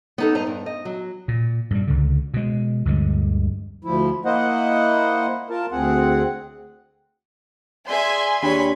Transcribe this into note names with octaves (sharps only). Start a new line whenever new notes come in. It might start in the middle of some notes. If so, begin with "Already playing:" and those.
B3 D#4 A4
G2 C5 D#5 A#5
G2
D#5
F#3
A#2
G2 A#2 G3
C#2 D3
B2 G#3
D2 G2 D3 G#3
D2 F3 E4
A#3 E4 C5 D#5 F#5
F4 A#4 A5
D2 C4 G#4 F#5
G#4 D5 E5 G#5 C6
D#2 D4 G4 C#5 B5